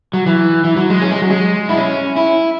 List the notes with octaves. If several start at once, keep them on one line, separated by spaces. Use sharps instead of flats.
F#3
E3
E3
F#3
G#3
C#4
G#3
F#3
G#3
E4
C#4
E4